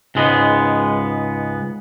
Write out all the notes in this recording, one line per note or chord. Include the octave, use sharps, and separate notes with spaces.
C#2 G#2 G#3 B3